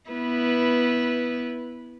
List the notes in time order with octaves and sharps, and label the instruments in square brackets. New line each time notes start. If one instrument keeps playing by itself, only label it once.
[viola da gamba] B3 E4 B4